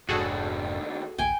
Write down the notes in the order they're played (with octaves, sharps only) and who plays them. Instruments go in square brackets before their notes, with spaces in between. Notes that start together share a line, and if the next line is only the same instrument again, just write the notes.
[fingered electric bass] F1 G#2 G#3 [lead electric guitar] D#2 D4 [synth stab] F#4 G#4 A4
[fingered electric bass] D1 A1 A#3 [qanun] G5 G#5